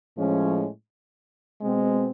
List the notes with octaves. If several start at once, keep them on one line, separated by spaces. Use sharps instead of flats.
A2 F3 G#3 C#4
B2 G#3 C4